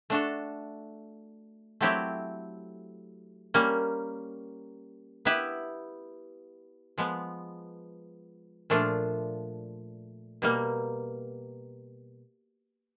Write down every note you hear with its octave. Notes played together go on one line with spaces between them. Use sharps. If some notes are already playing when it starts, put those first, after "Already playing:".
A3 D4 F#4 A4
F#3 A3 C4 E4 G4
G3 A#3 C#4
B3 E4 G4 B4 E5
F3 G#3 B3
A#2 F3 A3 D4 F4
B2 G3 A#3